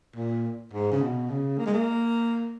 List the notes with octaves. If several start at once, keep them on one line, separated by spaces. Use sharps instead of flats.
A#2
G#2
C#3
B2
C#3
A#3
G#3
A#3